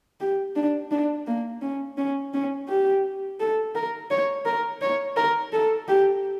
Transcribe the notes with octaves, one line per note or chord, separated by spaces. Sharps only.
G4
D4
D4
A#3
C#4
C#4
C#4
G4
A4
A#4
C#5
A#4
C#5
A#4
A4
G4